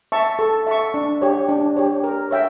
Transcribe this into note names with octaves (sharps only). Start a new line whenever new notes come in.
E5 A5 C#6
A4
E5 A5 C#6
D4
G4 C#5
D4
G4 C#5
A#4
C#5 E5 G5